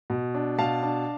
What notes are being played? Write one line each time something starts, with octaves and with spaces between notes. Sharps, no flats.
B2
D4
B2 F5 A5
D4